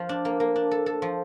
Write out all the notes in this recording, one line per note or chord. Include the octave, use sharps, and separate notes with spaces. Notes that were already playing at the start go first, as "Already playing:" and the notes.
Already playing: F3
D4
A#3
A#3
D4
A4
A4
F3